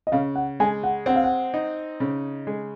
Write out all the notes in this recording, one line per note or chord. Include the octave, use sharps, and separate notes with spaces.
D#5
C#3 F5
F#5
G#3 G#5
F#5
C4 F#5
F5
F#5
D#4
C#3
G#3